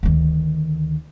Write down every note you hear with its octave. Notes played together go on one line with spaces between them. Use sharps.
D2 D#3